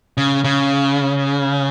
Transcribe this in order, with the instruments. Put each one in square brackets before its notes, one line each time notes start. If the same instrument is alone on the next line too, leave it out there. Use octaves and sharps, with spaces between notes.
[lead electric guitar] C#3
C#3